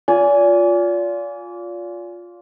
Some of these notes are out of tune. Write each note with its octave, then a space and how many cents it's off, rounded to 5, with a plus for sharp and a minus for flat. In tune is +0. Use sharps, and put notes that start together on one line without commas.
F4 +10 D5 -35 G#5 +0